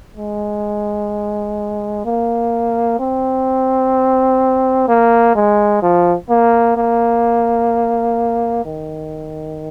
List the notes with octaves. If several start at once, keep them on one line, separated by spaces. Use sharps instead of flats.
G#3
A#3
C4
A#3
G#3
F3
A#3
A#3
D#3